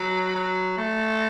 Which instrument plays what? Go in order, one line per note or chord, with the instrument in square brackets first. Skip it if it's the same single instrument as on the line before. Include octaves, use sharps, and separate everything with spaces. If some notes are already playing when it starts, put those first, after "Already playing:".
Already playing: [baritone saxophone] F#3
F#3
A3